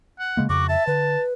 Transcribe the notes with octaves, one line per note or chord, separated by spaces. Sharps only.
F#5
C#3 G#3 A#3
F2 C#3 F#4 D6
E5 A5
D3 B4